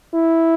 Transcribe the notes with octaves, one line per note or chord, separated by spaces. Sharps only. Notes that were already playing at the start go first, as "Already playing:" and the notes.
E4